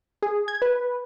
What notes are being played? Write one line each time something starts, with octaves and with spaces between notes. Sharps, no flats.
G#4
G#6
B4